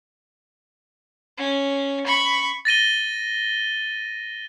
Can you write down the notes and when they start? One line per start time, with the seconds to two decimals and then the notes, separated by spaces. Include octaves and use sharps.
1.38 C#4
2.06 B5 C#6
2.65 A6 A#6 D#7 G7